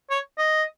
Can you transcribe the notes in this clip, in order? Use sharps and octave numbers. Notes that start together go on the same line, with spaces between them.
C#5
D#5